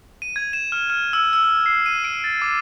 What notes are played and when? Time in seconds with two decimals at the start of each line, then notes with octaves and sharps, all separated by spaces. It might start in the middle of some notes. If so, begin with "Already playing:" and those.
0.22 D#7
0.36 G#6
0.53 E7
0.72 F6
0.90 F6
1.13 E6
1.33 E6
1.66 C7
1.86 D#7
2.04 D7
2.24 A6
2.42 D6